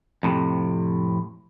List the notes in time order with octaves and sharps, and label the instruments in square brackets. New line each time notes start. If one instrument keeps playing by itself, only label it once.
[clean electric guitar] F2 A2 C3